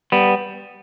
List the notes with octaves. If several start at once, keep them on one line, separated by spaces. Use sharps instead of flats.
G3 B3